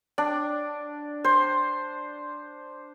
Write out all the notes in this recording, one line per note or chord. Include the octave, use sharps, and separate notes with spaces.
D4
C5